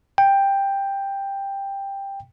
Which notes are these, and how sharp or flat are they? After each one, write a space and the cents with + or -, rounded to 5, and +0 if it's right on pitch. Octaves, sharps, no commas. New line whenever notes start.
G5 +10